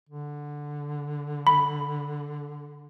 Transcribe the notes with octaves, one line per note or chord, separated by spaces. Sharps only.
D3
B5